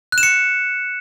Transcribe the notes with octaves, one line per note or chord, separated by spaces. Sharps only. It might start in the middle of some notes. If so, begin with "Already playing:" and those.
F#6
E7
C#7